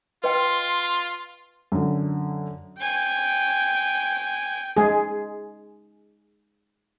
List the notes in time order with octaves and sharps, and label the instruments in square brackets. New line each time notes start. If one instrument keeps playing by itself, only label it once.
[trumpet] F4 [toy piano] B4 D#5 G5 [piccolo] C6
[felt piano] F#2 D3
[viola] G5 [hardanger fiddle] G#5
[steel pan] G#3 G#4